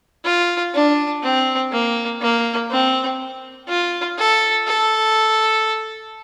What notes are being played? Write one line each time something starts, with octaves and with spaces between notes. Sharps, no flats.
F4
D4
C4
A#3
A#3
C4
F4
A4
A4